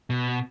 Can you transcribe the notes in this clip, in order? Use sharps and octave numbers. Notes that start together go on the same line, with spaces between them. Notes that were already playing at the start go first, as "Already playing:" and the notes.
B2